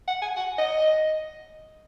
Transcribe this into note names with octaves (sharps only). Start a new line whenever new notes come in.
F#5
G#5
F#5
D#5